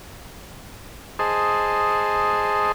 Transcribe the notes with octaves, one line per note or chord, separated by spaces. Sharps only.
G#4 C5 D#5 A5